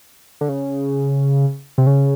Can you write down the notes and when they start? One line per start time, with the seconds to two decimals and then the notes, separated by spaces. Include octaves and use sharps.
0.41 D3
0.49 C#3
1.78 C3
1.87 C#3